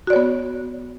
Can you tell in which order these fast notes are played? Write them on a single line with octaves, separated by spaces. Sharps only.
F#4 D5 C#5 B3